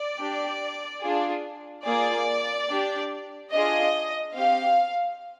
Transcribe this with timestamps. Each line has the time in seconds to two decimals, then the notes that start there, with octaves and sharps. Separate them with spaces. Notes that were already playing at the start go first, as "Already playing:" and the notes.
Already playing: D5
0.18 D4 G4
1.01 D4 F4 G#4
1.84 A#3 F4 G#4 D5
2.68 D4 G4
3.52 D4 F4 G#4 D#5
4.35 C4 G4 F5